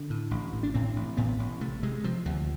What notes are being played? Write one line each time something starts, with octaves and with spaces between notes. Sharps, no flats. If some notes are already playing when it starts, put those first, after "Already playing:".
Already playing: D3
A2
A1
A2
D4
A2 C4
A1
A2 B3
A1
C3 A3
C3 G#3
C3 F3
D2 F3